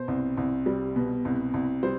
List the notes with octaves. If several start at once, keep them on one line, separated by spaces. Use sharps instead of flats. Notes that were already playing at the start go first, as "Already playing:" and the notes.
Already playing: B2 C5
C2
C2
G3
B2
C2
C2
G3 C5